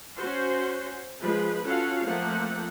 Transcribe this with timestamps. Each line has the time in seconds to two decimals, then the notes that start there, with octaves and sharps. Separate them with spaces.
0.18 C#4 F#4 C5
1.21 F3 G#3 B4
1.64 C#4 F4 F#4 A4 F5 F#5
2.05 F3 A3 A#3 C4 F#5